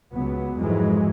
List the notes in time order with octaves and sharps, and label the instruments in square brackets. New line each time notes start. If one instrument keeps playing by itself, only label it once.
[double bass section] C#2 F#3 B3
F2 G#2 E3 F#3 G#3